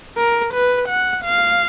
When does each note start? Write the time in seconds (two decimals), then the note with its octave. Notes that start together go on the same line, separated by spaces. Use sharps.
0.17 A#4
0.54 B4
0.89 F#5
1.24 F5